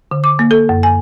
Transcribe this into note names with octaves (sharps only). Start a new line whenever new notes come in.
D3
D6
A#3
A4
F#2
G#5